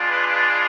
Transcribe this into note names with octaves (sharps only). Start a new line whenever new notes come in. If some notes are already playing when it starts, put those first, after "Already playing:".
Already playing: G#3 D4 F4
B4